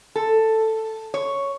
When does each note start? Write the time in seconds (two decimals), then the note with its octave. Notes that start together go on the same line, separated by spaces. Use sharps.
0.16 A4
1.14 C#5